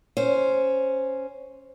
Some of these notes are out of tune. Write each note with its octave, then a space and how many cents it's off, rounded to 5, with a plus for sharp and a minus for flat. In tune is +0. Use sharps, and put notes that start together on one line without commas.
C#4 +0 C5 +0